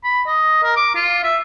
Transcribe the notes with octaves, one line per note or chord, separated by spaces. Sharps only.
B5
D#5
A#4
D6
F4
E5